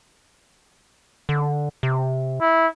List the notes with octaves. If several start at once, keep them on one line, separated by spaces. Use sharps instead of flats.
D3
C3
E4